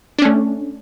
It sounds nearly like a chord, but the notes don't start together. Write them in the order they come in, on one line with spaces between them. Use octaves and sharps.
D4 C#4 A3